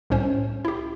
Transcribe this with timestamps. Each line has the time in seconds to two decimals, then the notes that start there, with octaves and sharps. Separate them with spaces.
0.10 C2 A2 C#4 C5
0.65 E4 G4